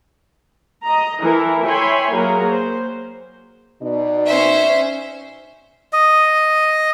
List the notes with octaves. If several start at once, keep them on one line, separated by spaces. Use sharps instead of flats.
D#5 A#5
E3 E4 A4 A#4
C#5 E5 G5 G#5 B5 C6
F#3 A#3 F#4 G#4 A#4 A#5
C5
B2 D#4 D5
C#4 C5 E5
D#5